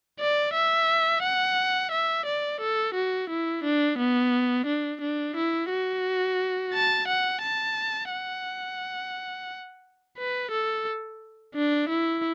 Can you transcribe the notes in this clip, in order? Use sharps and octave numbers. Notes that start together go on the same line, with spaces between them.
D5
E5
F#5
E5
D5
A4
F#4
E4
D4
B3
D4
D4
E4
F#4
A5
F#5
A5
F#5
B4
A4
D4
E4